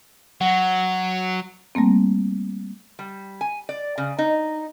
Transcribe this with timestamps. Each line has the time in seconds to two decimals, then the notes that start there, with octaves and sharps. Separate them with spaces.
0.41 F#3 F#5
1.75 G3 A3 A#3 C4
2.99 G3
3.41 G#5
3.69 D5
3.98 C#3
4.19 D#4